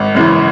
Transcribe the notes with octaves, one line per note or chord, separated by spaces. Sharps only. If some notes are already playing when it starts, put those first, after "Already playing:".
Already playing: G#1
F#2 C#3 E3